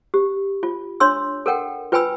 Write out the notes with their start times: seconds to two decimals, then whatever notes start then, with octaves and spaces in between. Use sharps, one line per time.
0.14 G4
0.63 F4
1.00 D4 C#5 C6 E6
1.46 A4 A#4 F#5 G5
1.92 F4 B4 G5 G#5 B5 E6